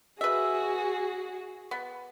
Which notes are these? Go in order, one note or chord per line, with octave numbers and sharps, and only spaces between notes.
F#4 G#4 B4 E5
B3